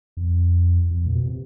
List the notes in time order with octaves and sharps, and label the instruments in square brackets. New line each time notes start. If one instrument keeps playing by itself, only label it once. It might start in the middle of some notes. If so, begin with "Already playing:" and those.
[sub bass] F2
F2
A#2
B2
C3